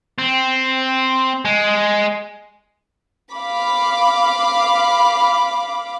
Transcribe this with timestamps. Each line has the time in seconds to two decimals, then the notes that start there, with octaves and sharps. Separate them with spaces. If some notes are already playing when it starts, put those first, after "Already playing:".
0.18 C4
1.45 G#3
3.33 F5 B5 D6